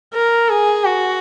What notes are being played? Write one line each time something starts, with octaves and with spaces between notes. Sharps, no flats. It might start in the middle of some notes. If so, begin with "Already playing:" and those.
A#4
G#4
F#4